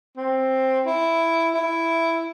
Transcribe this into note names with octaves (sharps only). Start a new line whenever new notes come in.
C4
E4
E4